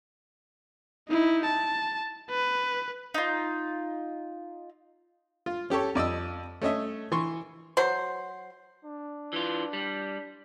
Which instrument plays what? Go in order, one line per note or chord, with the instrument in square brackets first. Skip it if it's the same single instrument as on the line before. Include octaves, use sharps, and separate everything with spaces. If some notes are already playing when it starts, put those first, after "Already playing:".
[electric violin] D#4 E4
A5
B4
[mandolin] D#4 F4
[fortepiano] F4
C#4 G4 A4 C#5
F2 D5 D#5 E6
A3 C#4 D#5 E5
E3 C6 C#6
[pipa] F#3 C5
[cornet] D4
[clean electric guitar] E3 F4
G3